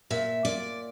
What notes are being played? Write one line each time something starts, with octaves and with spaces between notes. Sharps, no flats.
A#2 E5
A#2 D5